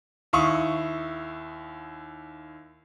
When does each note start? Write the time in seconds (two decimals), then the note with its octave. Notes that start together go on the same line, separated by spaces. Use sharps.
0.33 D#2 E4 F5 C#6 D#6